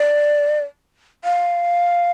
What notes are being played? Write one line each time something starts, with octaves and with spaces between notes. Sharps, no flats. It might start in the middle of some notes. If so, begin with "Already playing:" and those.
Already playing: D5
F5